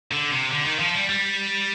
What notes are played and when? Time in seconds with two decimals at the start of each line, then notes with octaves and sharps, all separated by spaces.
0.12 D3
0.31 C3
0.51 D3
0.65 D#3
0.79 F3
0.94 G3
1.09 G3